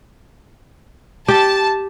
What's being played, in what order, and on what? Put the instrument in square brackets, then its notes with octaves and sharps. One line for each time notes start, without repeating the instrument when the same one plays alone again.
[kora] G4 [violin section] A5